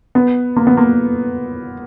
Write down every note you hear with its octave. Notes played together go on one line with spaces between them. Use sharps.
B3
A#3
B3
A#3